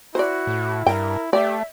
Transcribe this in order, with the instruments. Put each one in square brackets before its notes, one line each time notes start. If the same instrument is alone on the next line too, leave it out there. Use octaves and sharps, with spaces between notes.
[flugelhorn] E4 [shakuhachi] F#4 [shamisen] C5 D5
[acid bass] A2
[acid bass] G2 [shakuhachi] A#4 [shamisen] G5
[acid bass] A3 [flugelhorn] G4 [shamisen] D5 [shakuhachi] E5